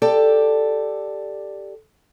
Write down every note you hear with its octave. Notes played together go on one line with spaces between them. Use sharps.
G4 A4 D5